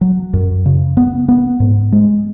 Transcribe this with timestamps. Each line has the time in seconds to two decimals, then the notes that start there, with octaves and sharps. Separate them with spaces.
0.01 F#3
0.33 F#2
0.66 C#3
0.97 B3
1.28 B3
1.60 G#2
1.92 G#3